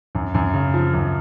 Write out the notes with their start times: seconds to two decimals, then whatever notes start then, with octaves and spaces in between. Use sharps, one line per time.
0.15 F#2
0.34 F#2
0.54 C#3
0.74 F3
0.94 F#2